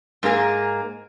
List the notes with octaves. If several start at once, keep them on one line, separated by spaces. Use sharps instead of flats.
G#2 A#3 G#4 A#4